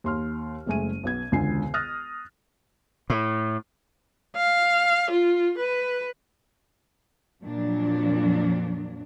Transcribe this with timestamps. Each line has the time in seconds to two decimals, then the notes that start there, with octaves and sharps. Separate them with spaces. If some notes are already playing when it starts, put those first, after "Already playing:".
0.04 D#2 C6 F6
0.66 F#1 G#3 A3 G#5 D#7
1.03 B1 B3 G#6
1.32 E1 C#2 D3 G#5 C7
1.74 D#6 F6 F#6 A6 A#6
3.10 A2
4.36 F5
5.11 F4
5.58 B4
7.43 F2 A#2 F3 F#3 D4